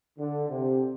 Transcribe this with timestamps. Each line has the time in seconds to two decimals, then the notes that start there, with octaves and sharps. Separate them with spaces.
0.19 D3
0.49 C3